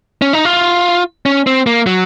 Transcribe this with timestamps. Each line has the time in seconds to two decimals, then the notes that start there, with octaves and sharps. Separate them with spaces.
0.22 C#4
0.33 D#4
0.45 F4
1.26 C#4
1.47 C4
1.67 A#3
1.87 F#3